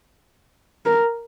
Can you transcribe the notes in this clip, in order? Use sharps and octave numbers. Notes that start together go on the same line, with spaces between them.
A#4